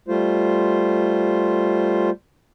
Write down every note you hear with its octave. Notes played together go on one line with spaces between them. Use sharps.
G3 A3 F4 C5